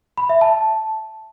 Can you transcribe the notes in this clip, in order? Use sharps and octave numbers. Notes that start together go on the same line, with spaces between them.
B5
E5
A5